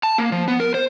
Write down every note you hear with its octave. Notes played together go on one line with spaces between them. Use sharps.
A5
A#3
F3
B3
A#4
C5